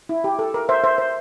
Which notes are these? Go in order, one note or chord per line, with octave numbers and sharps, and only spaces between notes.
E4
G4
A4
A#4
C5 E5
C5 E5
C5